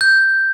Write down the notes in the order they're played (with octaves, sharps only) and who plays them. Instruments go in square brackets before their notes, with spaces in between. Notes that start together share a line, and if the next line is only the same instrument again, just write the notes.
[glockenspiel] G6